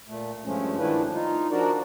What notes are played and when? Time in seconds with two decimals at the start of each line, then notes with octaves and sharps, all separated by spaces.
0.08 A#2 A3
0.45 G2 F3 G#3 A3 C#4
0.79 D#3 F3 A3 D4 E4 B4
1.13 D#4 F4
1.51 F3 D4 F#4 A#4 D5